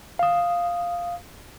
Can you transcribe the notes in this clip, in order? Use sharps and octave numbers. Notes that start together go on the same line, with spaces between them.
F5 D#6